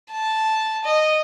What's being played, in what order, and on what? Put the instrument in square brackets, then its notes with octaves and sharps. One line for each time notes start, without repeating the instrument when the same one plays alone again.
[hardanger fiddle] A5
D#5